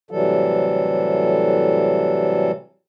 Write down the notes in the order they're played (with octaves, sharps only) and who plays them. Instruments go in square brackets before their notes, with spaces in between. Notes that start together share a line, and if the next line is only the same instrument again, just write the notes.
[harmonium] A2 C3 E3 F#3 G3 A4